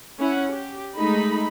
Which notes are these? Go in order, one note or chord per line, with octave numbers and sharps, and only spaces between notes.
C#4 E4 F#5
G4
G#3 A3 D#4 B5